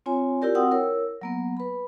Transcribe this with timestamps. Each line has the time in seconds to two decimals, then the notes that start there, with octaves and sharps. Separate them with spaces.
0.06 C4 F4 C#5 G#5
0.42 E4 F4 G4 A#4 D5
0.55 C4 F#4 F#5 G5 D#6 E6
0.71 E4 A#4 C#5 E6
1.21 F#3 A#3 B3
1.57 B4 B5